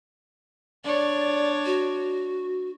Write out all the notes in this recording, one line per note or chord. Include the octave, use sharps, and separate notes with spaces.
D4 C#5 D5
F#4